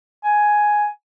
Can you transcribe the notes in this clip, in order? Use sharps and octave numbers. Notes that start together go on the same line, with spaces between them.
G#5